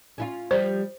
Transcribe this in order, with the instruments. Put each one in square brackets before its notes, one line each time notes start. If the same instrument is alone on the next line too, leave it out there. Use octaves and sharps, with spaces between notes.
[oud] C#4 E4 F4
[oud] F3 G3 [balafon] C5